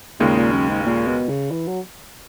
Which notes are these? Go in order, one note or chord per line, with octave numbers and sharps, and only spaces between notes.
D#2 A#2 C#3 G#3 D#4
A#2
F#2
G#2
G#2
A#2
B2
C#3
E3
F#3